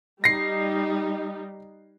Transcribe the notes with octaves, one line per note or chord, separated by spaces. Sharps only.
G3 D#4 A#6 C7